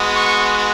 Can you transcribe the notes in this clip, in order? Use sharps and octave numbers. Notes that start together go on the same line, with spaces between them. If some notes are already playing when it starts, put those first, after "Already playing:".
Already playing: G#3 B3 F#4
C#6